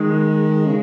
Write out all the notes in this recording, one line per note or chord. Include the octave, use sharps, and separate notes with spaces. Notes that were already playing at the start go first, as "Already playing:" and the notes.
Already playing: D#3 G#3
C#3